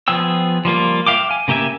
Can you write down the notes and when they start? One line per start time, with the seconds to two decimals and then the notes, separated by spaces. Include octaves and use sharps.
0.08 F3 B3 G#4 G5 E6
0.65 F3 G3 A#3 F4
1.07 E5 F5 G5 D6
1.31 G#5
1.48 C#3 A#3 G4 E5 G#5